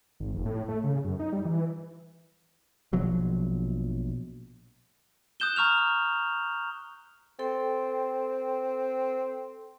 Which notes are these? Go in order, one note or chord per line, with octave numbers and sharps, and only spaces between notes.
G#1
F1
A2
A3
C#3
F#2
D#4
G3
E3
A#1 B2 F3 F#3
D#6 F#6 G6 E7 G7
A#5 C#6 F6 F7
C4 A4 G5 C6